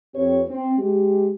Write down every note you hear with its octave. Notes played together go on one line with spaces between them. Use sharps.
F2 C4 G4 B4 C#5
C4
G#3 G4